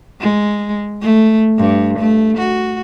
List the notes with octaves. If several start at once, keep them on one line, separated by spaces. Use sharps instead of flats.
G#3
A3
G2
A3
F#4